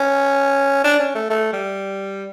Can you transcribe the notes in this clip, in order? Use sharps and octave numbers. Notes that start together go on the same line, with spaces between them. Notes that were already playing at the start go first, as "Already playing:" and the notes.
Already playing: C#4
D4
C#4
A3
A3
G3